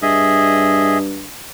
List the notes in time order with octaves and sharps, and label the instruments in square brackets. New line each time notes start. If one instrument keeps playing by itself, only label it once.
[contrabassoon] G2 [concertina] G#4 D#5 E5